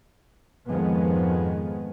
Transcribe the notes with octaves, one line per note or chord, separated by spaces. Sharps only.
F2 G#2 D#3 F3 G#3 B3